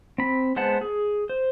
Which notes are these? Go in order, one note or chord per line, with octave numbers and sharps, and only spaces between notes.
C4 B5
G#3 B3 C5 F#5 A5
G#4
C5